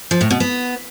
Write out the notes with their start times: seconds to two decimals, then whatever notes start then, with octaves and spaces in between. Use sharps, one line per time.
0.11 F3
0.21 A2
0.30 B2
0.40 B3